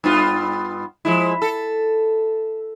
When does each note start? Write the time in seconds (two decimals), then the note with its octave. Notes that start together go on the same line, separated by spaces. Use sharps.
0.04 G2 B3 F4
1.05 F3 G#3 E4
1.42 A4